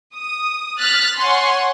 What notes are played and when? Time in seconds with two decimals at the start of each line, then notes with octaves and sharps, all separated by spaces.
0.16 D#6
0.80 F6 F#6 A6 B6
1.18 C#5 F#5 G#5 C6